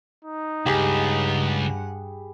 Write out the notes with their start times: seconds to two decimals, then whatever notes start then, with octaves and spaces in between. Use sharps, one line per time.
0.24 D#4
0.66 C#2 G2 G4 G#4 F#5 B5